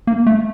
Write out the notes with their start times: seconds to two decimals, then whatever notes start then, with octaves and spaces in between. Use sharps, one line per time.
0.07 A#3
0.27 A3